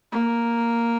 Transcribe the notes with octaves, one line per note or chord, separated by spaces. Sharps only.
A#3